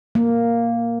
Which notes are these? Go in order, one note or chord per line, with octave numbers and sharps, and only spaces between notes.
A#3